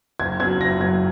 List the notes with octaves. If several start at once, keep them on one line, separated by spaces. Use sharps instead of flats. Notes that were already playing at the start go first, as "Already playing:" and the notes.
F#1 G#6
F#2 F#3 G#6
F#1 A#6
F#2 F#3 G#6